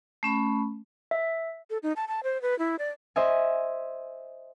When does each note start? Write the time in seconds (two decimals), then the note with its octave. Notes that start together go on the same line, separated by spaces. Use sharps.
0.23 A3 C#4 B5
1.11 E5
1.70 A4
1.83 D#4
1.96 A5
2.08 A5
2.23 C5
2.42 B4
2.59 E4
2.79 D5
3.16 C5 D#5 E5 G#5